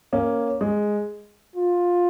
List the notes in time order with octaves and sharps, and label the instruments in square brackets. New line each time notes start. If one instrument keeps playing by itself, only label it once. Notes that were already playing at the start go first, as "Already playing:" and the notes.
[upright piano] A#3 C#4
G#3
[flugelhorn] F4